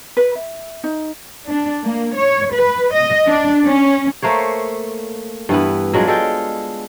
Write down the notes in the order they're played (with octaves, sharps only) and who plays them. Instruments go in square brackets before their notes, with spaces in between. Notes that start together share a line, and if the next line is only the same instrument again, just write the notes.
[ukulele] B4
E5
D#4
[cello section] D4
A#3
C#5
B4
D#5
D4
C#4
[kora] A3 A#3 C5 C#5
G2 E3 B3
F#3 G#3 D4 F4
G#3 A4 G5